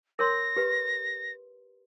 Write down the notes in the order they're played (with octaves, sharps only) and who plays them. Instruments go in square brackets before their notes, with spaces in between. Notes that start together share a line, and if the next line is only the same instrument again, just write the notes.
[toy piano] A#4 C#5 C6 [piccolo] A#6
[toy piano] G4 B4